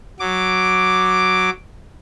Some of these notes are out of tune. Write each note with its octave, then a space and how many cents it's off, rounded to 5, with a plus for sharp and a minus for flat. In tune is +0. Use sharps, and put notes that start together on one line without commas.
F#3 +0 D6 +0